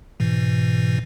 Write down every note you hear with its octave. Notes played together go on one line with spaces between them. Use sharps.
G#2 B2 E3